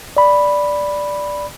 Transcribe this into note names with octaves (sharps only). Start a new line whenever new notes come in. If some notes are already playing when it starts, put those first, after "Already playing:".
D5 B5